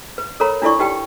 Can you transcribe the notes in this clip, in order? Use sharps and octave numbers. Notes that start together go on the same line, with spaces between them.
B4
A4 A#4 C#5 A#5 B5
D4 E4 F4 A4 D5 C#6
D#4 G4 B4 G5